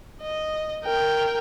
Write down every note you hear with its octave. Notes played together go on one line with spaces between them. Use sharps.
D#5
A#4 G5